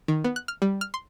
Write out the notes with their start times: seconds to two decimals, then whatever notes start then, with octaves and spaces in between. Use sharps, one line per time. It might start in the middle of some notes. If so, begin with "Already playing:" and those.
0.08 D#3
0.24 B3
0.36 F#6
0.48 F6
0.62 G3
0.81 F6
0.94 C6